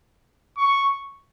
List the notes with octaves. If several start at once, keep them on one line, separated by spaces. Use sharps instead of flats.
C#6